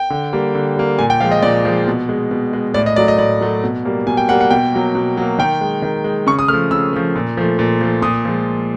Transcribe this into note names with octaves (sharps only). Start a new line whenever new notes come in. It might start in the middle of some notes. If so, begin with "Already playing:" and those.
Already playing: G5
D3
G3 A#3
D3
G3 A#3
A#2 G#5
G5
F3 G#3 F5
D#5
A#2 D5
F3 G#3
B2
G#3
B2
G#3
A2 D5
D#5
F#3 A3 D5
D#5
A2 D5
F#3 A3
B2
G3 A#3
B2 G#5
G5
G3 A#3 F#5
F#5
B2 G5
F#3 A#3
B2
F#3 A#3
D#3 G5
G#3
D#3
G#3
C#3 C#6
D#6
F3 A3 F6
C#3 E6
F3 A3
A#2
F3 A3
A#2
F3 A3
A#2 D#6
F3 G#3